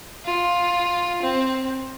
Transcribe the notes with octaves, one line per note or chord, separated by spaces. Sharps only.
F4
C4